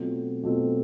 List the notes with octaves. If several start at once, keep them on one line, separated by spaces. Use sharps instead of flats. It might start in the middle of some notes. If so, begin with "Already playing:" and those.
Already playing: B2 F#3 A3 C4 F4
B2 F#3 A3 C4 F4